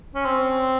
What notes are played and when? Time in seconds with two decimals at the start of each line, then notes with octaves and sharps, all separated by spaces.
0.15 C#4
0.25 C4